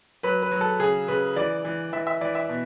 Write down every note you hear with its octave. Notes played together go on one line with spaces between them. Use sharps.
F#3 B4
B4
F#3
A4
C#3 G#4
C#3 B4
E3 D5
E3
E3 E5
E5
E3 D5
E5
B2